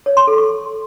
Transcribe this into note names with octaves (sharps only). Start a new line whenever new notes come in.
C#5
C6
A4
C#6